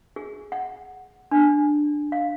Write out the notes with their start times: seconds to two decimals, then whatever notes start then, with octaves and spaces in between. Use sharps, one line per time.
0.16 G#4
0.52 F#5
1.31 D4
2.12 F5